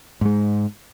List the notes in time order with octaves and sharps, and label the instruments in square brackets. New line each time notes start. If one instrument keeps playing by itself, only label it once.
[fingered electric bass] G#2 G#3